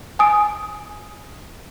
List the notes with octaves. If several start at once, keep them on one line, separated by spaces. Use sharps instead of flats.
G#5 D#6 D7